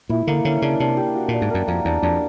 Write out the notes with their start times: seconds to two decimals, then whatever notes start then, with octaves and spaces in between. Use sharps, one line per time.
0.09 A#2 E4
0.27 D3 A#3
0.45 D3 C#4
0.62 C#3 D4
0.80 C3 D4
0.97 G4
1.15 F#4
1.28 A#2 D5
1.42 G#2
1.50 F#2 A#4
1.68 F2 A#3
1.85 E2 D4
2.03 F2 D4